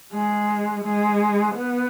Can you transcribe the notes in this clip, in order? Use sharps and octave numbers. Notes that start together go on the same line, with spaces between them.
G#3
G#3
B3